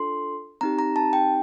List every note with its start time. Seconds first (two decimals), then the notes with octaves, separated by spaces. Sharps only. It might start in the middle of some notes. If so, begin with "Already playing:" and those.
Already playing: D4 F4 A4 C6
0.61 C4 D#4 G4 A#5
0.79 A#5
0.96 A5
1.13 G5